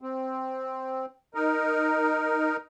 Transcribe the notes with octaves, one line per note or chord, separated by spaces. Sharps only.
C4
D#4 A#4